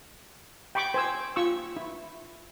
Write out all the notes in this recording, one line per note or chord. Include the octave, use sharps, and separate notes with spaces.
G5 B5 C#6 D6
C5 G#5 E6
F4 C#6 E6
E4